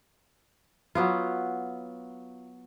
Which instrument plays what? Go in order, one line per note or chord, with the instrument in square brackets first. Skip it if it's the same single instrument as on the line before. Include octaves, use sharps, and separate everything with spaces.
[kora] F#3 B3 F4